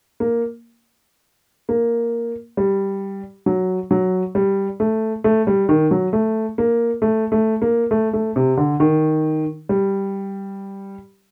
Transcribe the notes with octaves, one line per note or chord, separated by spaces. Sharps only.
A#3
A#3
G3
F#3
F#3
G3
A3
A3
G3
D#3
F#3
A3
A#3
A3
A3
A#3
A3
A3
C3
D3
D#3
G3